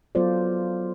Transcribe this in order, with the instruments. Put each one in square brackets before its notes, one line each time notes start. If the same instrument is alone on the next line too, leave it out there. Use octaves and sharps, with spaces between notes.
[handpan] F#3 B3 F4 A4 C5 D5